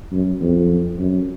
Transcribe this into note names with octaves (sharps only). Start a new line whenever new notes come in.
F#2
F2
F#2